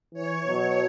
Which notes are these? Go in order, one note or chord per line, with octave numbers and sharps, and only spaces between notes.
E3 C#5
B2 F#3